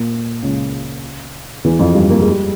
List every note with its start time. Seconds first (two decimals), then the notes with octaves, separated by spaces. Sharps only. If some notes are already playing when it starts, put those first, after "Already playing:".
Already playing: A#2 A#3
0.42 C#2 C#3
1.64 E2 E3
1.79 F2 F3
1.95 G2 G3
2.10 A#3
2.21 G#3
2.32 G3